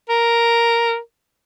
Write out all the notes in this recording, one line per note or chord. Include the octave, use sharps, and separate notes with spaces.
A#4